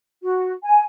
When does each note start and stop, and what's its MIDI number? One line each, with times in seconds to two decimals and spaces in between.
0.22 0.53 66
0.64 0.82 80